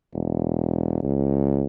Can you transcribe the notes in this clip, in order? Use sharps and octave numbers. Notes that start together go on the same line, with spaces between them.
E1
C#2